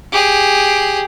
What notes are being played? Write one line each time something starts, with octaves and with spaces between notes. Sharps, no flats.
G4 G#4